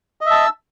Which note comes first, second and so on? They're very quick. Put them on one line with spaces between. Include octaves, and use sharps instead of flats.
D#5 E5 A5 E6